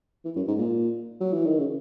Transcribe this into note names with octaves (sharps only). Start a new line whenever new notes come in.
E3
F#2
G#2
A#2
F#3
E3
D#3
C#3